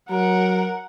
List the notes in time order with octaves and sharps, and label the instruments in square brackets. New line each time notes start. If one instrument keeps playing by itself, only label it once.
[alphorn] F#3 [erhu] A#4 [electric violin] F#5